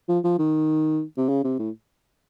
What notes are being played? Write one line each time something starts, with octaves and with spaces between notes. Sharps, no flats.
F3
F3
D#3
C3
C#3
C3
A2